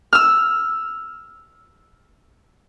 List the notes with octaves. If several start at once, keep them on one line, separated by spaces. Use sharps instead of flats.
E6 F6